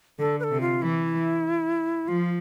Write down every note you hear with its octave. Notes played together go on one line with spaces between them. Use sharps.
D3 A4
B4
A4
C3
F4
E3 E4
F3 F4